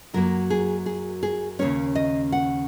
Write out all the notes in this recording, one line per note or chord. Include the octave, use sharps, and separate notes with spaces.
F#2 F#3 A#3 A#4
G#4
G#4
G#4
D#2 C#3 A#3 C#4 C#5
D#5
F#5